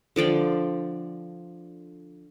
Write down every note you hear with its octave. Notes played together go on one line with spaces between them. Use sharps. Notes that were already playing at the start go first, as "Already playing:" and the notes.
D3 F3 D5 G5